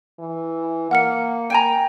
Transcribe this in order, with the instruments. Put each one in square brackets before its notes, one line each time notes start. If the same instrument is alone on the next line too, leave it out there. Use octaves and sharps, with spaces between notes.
[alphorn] E3
[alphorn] A#3 [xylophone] F#5 F6 C#7
[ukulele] G5 G#5 A#5